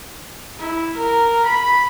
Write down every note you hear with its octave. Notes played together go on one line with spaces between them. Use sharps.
E4
A#4
B5